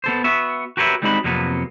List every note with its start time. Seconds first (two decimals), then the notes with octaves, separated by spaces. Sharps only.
0.04 B3 A4 C5
0.24 B3 F#4 E5
0.77 F#4 G4 A#4 B4 C#5 E5
1.02 G3 G#3 C4 D#4 F#4 B5
1.24 F2 C3 F#3 A#3 B3